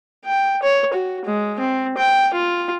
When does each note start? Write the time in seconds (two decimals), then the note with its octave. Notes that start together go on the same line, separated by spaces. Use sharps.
0.25 G5
0.63 C#5
0.93 F#4
1.25 G#3
1.59 C4
1.97 G5
2.34 F4